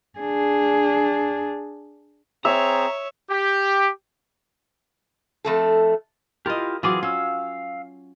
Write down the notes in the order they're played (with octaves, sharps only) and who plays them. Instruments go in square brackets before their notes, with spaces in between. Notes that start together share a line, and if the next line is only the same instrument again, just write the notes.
[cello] D4 G#4
[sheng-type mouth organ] C4 G#4 [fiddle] C#5 [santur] E5 [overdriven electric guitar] A#5
[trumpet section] G4
[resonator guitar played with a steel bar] F2 A3 A4
[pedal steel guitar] E4 F4 G4 [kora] A#4 D#5
[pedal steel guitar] E3 G#4 D6 [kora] F#3 C4 F4
[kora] C#4 [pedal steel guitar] F5 E6